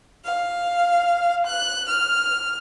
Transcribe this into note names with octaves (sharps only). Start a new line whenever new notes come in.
F5
F#6
F6